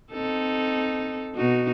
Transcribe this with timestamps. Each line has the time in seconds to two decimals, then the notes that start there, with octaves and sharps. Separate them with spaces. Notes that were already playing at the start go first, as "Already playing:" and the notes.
0.12 C4 D#4 A4
1.34 B2 D#4 F#4